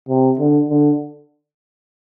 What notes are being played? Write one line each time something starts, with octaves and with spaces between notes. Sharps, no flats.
C3
D3
D3